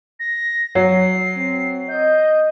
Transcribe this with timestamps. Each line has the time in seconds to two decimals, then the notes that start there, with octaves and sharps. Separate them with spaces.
0.20 A#6
0.75 F#3 C7
1.37 C4
1.89 D#5 G6